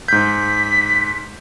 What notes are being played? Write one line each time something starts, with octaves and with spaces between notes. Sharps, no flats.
G#2 G6 B6